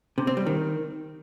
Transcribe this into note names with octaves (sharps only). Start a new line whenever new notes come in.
C3
C4
G3
D#3